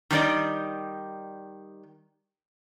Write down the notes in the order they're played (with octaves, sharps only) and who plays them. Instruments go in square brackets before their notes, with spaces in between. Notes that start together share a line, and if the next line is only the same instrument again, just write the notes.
[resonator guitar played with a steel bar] D#3 G3 D#4 D5 D#5